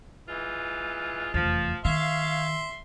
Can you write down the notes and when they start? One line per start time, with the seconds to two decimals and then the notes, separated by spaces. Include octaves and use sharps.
0.28 E3 G#3 F4
1.34 F1 E2 F3
1.85 D#3 C#5 E5 F5 C6